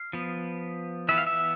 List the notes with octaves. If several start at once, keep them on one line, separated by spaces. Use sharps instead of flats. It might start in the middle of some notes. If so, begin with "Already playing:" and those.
Already playing: F5
F3 B3
E3 B3 E5
F5
E5